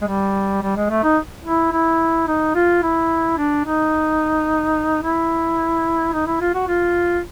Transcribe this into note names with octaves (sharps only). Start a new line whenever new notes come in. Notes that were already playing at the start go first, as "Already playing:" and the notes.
G#3
G3
G3
G#3
A3
D#4
E4
E4
D#4
F4
E4
D4
D#4
E4
D#4
E4
F4
F#4
F4